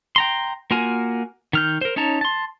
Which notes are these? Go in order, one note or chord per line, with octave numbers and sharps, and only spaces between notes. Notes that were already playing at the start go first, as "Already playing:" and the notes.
G5 A#5 C6
A#3 F4 F#4 A#4 G#5
D#3 F6 G6
A#4 C5
C#4 D#4 C#5 A5 A#5
A5 C6